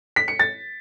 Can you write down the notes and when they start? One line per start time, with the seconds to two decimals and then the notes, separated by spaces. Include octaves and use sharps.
0.16 B6
0.28 C#7
0.39 A6